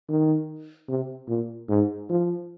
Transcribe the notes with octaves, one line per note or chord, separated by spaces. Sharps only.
D#3
C3
A#2
G#2
F3